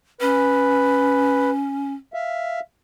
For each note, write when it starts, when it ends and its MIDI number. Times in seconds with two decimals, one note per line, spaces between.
0.21 1.93 61
0.21 1.50 71
2.14 2.60 76
2.14 2.60 77